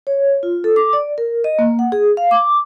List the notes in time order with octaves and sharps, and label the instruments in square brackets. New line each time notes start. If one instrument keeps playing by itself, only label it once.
[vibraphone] C#5
F4
A4
D6
D5
A#4
D#5
A#3
F#5
G#4
F5
D6